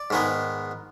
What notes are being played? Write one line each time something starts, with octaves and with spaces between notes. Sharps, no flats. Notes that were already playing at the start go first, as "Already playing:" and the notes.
Already playing: D5
G#2 D#3 G#3 B3